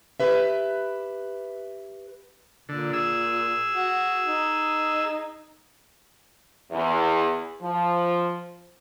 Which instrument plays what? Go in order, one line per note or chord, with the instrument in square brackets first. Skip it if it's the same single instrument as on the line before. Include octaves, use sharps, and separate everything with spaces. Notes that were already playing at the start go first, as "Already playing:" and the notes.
[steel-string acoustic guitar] G4 B4 E5
[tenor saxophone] A#2 [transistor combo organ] D3
[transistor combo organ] G#4 E6
[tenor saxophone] F#4
D#4
[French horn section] E2
F3